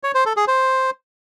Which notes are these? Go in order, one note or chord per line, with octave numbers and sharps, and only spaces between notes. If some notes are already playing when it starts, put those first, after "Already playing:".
C#5
C5
A4
G#4
C5